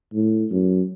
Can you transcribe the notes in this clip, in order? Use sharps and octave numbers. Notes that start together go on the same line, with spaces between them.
A2
F#2